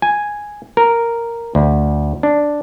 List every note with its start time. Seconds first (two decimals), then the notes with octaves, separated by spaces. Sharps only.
0.02 G#5
0.77 A#4
1.55 D2
2.23 D4